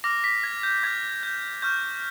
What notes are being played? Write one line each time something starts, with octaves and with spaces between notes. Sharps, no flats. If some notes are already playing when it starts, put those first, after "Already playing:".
D6 F6 A#6
B6
G#6
G6
D6 F6 G#6
G6
C#6 F6 G6